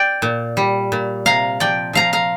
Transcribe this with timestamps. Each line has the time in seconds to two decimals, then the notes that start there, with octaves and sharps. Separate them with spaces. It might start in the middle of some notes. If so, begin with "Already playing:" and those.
Already playing: D5 G5
0.22 A#2
0.57 G3
0.92 A#2
1.26 C3 F5 A#5
1.60 F3 D5 G5
1.93 F3 F5 A#5
2.13 F5 A#5